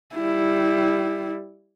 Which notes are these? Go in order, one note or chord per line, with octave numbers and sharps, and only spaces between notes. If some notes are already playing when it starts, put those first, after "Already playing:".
G3 E4